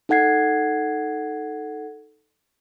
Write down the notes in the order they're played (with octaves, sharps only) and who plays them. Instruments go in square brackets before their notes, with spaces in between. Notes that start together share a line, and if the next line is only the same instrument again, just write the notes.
[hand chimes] D#4 A4 F#5 G#6 C7